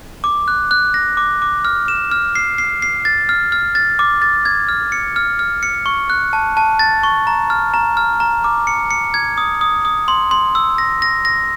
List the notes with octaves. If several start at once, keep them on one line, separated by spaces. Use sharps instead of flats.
D6
F#6
F#6
A#6
D6
D6
F6
E7
F6
C7
C7
C7
A6
F6
F6
A6
D6
A6
G#6
F6
C#7
F6
F6
C#7
C#6
F#6
A5
A5
A6
C#6
A#5
F6
A#5
F6
A#5
D6
C#7
C#7
G#6
D#6
D#6
D#6
C6
C6
E6
A#6
A#6
A#6